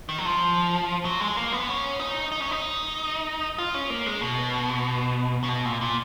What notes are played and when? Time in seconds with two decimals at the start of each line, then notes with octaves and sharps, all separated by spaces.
0.09 D#3
0.18 F#3
0.25 F3
1.05 F#3
1.21 G#3
1.37 A#3
1.52 B3
1.69 C#4
1.99 D#4
2.32 D#4
2.42 C#4
2.51 D#4
3.58 F4
3.74 C#4
3.90 A#3
4.06 G#3
4.22 B2
5.43 C#3
5.49 B2
5.65 A#2
5.81 A#2